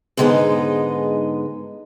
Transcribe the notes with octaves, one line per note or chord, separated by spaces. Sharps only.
G#2 D3 G#3 A#3 B3 D#4